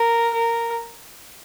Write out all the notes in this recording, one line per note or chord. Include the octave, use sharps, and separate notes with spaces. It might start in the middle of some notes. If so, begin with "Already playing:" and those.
Already playing: A#4
A#4